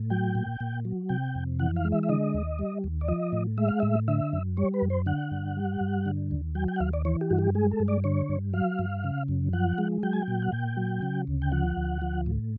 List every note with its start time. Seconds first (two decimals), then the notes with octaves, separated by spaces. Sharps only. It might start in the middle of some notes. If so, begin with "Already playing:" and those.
Already playing: A2
0.10 F#3 G5
0.35 A#2
0.60 A#2
0.85 F#3
1.09 C3 G5
1.35 F2
1.59 E3 F#5
1.76 F5
1.85 G#3
1.92 E5
2.03 E5
2.09 D3 D#5
2.34 D#2
2.59 G3
2.84 D#2
3.01 D5
3.08 F3 D#5
3.32 A2
3.57 G#3 E5
3.68 F5
3.80 A2 E5
4.08 D3 E5
4.33 F#2
4.57 G3 C#5
4.74 B4
4.82 F#2
4.90 C5
5.06 D3 F#5
5.31 G2
5.57 G3
5.81 G2
6.06 D3
6.31 D#2
6.55 F#3 G5
6.68 G5
6.76 F#5
6.80 D#2 F5
6.93 D5
7.05 E3 C#5
7.21 G4
7.31 G2 F#4
7.38 G4
7.55 G#3 G#4
7.71 A4
7.80 G2
7.88 D5
8.04 D3 C#5
8.29 G2
8.53 F#3 F5
8.79 G2
9.04 C#3
9.28 F#2
9.53 F3 F#5
9.78 G#3
10.03 F#3 G5
10.13 G#5
10.22 G5
10.28 A#2
10.42 F#5
10.52 A#2 G5
10.77 F#3
11.02 C#3
11.27 D2
11.42 G5
11.52 F3 F#5
11.77 D2
12.02 F3
12.26 A2